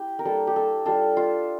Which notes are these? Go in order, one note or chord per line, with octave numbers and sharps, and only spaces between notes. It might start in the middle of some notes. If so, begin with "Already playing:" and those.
Already playing: E4 G4
A#4
G3 A#3 D4 A4
G4
A4
G3 D4 F4 A4
F4